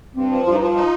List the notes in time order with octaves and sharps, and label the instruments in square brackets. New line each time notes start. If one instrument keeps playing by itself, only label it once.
[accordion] G2 [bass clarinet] C4
[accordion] F3
[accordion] G2 [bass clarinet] F4
[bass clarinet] D#4
[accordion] F3 [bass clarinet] F4
[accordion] D#4